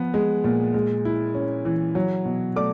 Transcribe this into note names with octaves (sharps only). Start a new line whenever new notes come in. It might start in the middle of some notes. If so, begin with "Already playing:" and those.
Already playing: F3 B3
G#3
A#2
G#3
E4
C#4
E3
F#3
B2
A3 D5 D6